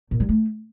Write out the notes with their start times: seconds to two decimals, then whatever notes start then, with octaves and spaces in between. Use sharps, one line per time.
0.11 A#2
0.20 G3
0.29 A3